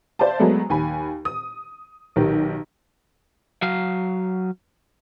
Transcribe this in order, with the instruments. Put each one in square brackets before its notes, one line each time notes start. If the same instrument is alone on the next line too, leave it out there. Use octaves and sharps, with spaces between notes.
[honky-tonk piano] C5 D5 E5 F5 A5
F#3 G#3 A3 B3
D#2 G#5 B5
D#6
B1 D#3 G4
[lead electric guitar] F#3 F5